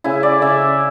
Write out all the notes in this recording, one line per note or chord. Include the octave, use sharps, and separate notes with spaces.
C#3 E4
D5
C#3 E5